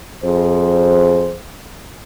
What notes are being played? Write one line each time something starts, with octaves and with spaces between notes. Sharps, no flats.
F2 G#4 C5